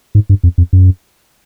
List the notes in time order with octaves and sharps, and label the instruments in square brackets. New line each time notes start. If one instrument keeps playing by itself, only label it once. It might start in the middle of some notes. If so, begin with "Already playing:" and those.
[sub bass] G#2
G2
F2
F2
F#2